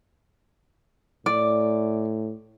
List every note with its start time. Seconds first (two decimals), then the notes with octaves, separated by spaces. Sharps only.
1.26 A2 D5